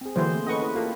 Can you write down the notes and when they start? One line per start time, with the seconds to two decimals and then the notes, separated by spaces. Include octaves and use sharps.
0.01 C4 G#4
0.16 D3 E3 F#3 A#3 G#4 C5
0.31 A3 C4
0.47 C#4 A4 B4 D#5 F#5 C#6
0.61 C4 E4 B4
0.75 A#3 F4 G4 A4